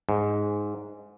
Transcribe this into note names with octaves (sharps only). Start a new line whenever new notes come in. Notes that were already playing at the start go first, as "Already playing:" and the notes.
G#2